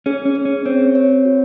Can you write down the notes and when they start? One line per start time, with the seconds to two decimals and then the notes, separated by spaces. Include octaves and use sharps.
0.06 C#4 G#4
0.25 C#4
0.35 G#4
0.45 C#4
0.65 C4 C#5
0.95 C#5
1.25 F#4